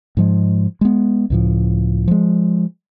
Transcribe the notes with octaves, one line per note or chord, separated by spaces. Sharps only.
G#2 F3 G#3
G#3 B3
C#2 A2 F3
F3 G#3